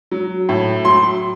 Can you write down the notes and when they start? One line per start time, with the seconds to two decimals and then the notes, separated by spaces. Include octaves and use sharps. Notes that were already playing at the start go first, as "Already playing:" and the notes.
0.11 F#3
0.49 A2
0.85 F#3 C6